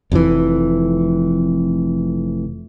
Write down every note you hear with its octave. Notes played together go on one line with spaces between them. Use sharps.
F1 F2 A#2 E3